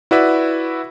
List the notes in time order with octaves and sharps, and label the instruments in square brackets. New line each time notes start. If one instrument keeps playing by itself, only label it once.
[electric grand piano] E4 F#4 B4 D5 E5